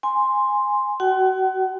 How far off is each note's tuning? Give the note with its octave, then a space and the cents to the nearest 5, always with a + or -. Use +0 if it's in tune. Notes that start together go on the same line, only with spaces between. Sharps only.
G#5 -10 C6 +0
F#4 +25 F#5 +40